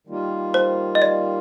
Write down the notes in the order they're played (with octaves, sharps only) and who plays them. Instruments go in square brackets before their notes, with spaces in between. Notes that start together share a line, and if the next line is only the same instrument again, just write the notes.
[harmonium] D#3 G3 A#3 F4
[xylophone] C5
D#5
D5